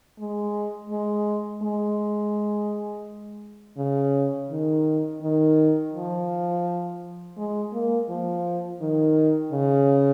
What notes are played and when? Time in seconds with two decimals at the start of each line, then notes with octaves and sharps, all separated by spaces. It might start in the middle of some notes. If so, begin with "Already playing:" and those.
0.19 G#3
0.90 G#3
1.62 G#3
3.77 C#3
4.50 D#3
5.22 D#3
5.93 F3
7.37 G#3
7.73 A#3
8.09 F3
8.81 D#3
9.52 C#3